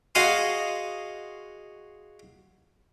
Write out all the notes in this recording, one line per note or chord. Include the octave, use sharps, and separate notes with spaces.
F#4 G#4 D#5 F5 C6